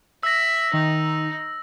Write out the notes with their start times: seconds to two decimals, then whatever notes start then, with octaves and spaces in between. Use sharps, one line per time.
0.23 E5 E6 A#6
0.73 D#3 D#4